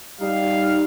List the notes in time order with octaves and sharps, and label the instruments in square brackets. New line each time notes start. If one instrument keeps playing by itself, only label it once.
[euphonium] G3 [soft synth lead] D#4 [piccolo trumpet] F5